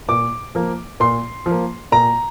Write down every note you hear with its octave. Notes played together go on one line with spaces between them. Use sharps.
A#2 D6
F3 A#3
A#2 C6
F3
A#3
A#2 A#5